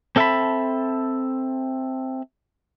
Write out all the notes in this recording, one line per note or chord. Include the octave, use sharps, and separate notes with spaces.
C4 A4 E5 F#5 A5 B5